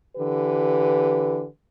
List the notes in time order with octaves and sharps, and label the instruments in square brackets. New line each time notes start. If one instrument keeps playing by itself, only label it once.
[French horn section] D3 E3 G4 B4